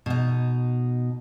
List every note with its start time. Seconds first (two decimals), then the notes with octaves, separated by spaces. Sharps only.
0.06 B2 D#4